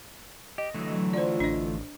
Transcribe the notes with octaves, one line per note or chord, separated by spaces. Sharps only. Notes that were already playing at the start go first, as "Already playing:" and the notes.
G4 D#5
D3 E3 F#3 A3
F4 C5 D5
A1 D4 D#5